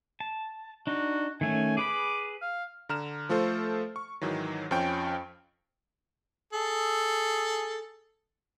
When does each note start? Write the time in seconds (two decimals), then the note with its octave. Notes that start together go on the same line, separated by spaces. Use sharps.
0.20 A5
0.87 D4 D#4 F#4
1.41 D#3 A3 C#4 G#5
1.77 G#4 B4 B5 D6
2.42 F5
2.89 D3 A#5 F6 E7
3.29 F3 A3 F4 A4 C5
3.96 C#6
4.21 G#2 D#3 E3 F#3
4.71 F2 F3 C#4 G5 C#6 D7
6.53 G#4 A4